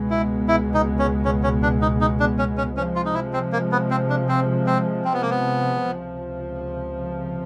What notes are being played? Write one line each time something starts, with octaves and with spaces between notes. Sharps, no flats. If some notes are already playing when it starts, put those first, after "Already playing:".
Already playing: C#2 B2 G#3 B3
E4
E4
D#4
C#4
C#4
C#4
D4
D#4
D#4
D4
C#4
C#4
C3 F3 G#3 C#4
F4
D#4
E4
C4
A#3
B3
C4
D4
C4
C4
C4
B3
A#3
B3
C#2 C3 F3